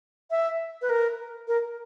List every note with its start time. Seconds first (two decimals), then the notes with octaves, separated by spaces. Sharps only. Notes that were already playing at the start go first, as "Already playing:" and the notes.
0.31 E5
0.82 B4
0.89 A#4
1.48 A#4